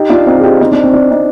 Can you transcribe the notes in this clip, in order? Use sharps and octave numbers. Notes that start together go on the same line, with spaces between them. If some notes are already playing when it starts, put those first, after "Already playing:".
Already playing: D#4 G4
D4 F4
C4 D#4
G#4
D#4 G4
C4 D#4
D4
C4
D4
C4 D#4